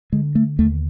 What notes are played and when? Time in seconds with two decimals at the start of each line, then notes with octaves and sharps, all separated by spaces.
0.13 D3 G#3
0.35 A3
0.59 D#2 A3